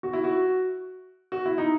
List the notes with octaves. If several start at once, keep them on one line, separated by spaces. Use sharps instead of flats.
F#4
E4
F#4
F#4
E4
D#4